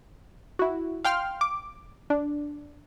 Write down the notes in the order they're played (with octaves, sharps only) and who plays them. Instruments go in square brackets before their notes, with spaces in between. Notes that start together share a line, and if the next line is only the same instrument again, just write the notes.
[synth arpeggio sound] E4 F#4
F5 G5 C6 F6
D6
D4